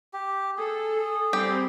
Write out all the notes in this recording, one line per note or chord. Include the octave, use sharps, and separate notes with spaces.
G4
G#4 A4
G3 C4 G4